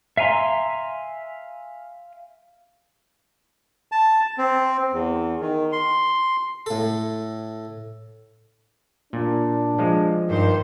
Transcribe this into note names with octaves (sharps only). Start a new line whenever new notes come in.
E5 F5 G#5 A#5 C6
A5
C4
E2
D#3
C6
A2 A4
A#2 D4
F3 G#3
G2 D#3 C5